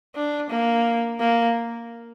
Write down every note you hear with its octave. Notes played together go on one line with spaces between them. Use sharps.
D4
A#3
A#3